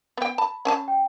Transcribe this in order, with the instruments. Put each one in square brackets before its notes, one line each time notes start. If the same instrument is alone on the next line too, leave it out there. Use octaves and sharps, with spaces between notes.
[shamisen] B3 G5
[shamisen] A5 [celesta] B5
[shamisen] C#4 G#5 A5
[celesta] G5